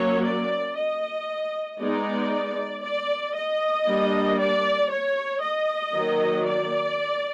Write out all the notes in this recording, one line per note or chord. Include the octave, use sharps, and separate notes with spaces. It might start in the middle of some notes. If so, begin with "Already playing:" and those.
Already playing: F#3 A#3 C#4 C#5
D5
D#5
G#3 B3 D#4 D5
D5
D#5
G3 A#3 D4
D5
C#5
D#5
D#3 F#3 A#3
D5